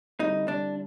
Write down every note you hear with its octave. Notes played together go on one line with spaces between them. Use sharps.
D3 G3 C4 D#4 E4
D4